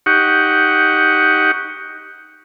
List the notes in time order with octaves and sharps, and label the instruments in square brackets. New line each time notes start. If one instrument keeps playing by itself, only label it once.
[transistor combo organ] D#4 G4 F#5 C#6